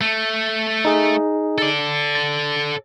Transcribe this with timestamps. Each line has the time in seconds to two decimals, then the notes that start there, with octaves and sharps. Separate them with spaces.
0.01 A3
0.85 D#4 G#4
1.58 A4 D5
2.15 A6